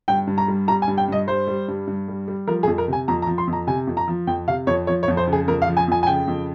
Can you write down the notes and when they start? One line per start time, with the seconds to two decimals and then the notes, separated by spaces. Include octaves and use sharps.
0.08 G2 G5
0.27 G2
0.38 A#5
0.48 G3
0.68 G3 A#5
0.82 G#5
0.88 G2
0.98 G5
1.08 G2 D#5
1.27 G3 C5
1.47 G3
1.68 G2
1.87 G2
2.08 G3
2.28 G3
2.47 F3 A#4
2.63 G#4
2.67 F2
2.78 A#4
2.88 C3 G#5
3.08 F2 A#5
3.22 A#5
3.27 F3
3.38 C6
3.47 F2
3.53 A#5
3.67 C3 G#5
3.87 F2
3.97 A#5
4.08 F3
4.27 F2 G5
4.47 C3 F5
4.67 F2 C#5
4.87 F3 C#5
5.03 C#5
5.08 F2
5.17 C5
5.27 C#3
5.33 G#4
5.48 F2 A#4
5.62 F5
5.68 F3
5.77 G#5
5.88 F2 G#5
6.03 G#5
6.07 C#3 G5
6.27 F2